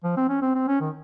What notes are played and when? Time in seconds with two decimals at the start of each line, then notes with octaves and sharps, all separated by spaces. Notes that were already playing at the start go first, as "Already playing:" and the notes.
0.04 F3
0.17 C4
0.29 C#4
0.42 C4
0.55 C4
0.68 C#4
0.80 D#3